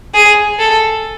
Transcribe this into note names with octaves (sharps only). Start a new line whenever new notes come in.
G#4
A4